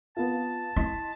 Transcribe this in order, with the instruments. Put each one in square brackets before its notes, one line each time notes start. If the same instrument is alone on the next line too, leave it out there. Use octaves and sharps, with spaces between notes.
[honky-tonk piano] B3 F4 [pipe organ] A5
[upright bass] E4 [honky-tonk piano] D#5 C6 B6